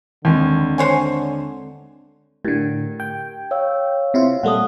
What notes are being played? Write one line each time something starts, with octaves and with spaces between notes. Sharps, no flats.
D#2 D3 G#3 C4 G#6
C5 C#5 G#5
A2 D3 G4 A#4 G#6
G5
C#5 F5 E6
C3 E4 F4
A#2 G3 A3 F#5 D#6